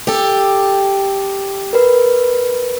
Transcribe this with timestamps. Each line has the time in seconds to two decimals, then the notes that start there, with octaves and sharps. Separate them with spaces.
0.07 G4 A4
1.73 A#4 B4